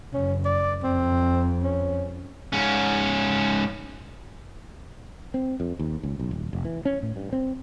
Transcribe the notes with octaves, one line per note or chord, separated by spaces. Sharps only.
F#1 C#4
D5
F2 C4
C#4
G#2 C#4
C4
F2
D#2
C#2
B1
D#1
F1
E3
C#4
A2
G2
C4